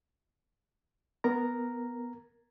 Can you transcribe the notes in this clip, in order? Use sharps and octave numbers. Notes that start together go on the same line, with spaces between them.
B3 A#4 A#5